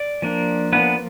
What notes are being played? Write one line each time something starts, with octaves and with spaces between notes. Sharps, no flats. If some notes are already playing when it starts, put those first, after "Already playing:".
Already playing: D5
F3 A#3 D4
F3 A#3 B3 D4 B4